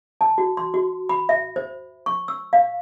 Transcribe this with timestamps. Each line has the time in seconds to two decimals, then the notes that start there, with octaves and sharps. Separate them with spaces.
0.21 A5
0.38 F#4
0.57 C6
0.74 F#4
1.09 B5
1.29 E5
1.56 C5
2.06 C#6
2.28 E6
2.53 F5